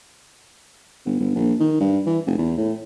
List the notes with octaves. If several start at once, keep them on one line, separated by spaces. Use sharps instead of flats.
G1
G1
A#1
D#3
G2
E3
F1
E2
A2